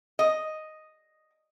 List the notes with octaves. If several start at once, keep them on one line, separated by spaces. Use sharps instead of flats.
D#5